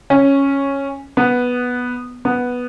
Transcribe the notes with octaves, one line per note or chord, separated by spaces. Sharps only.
C#4
B3
B3